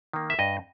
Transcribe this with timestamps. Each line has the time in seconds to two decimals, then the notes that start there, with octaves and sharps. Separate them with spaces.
0.13 D#3 A#3
0.30 E5
0.39 G2 D#5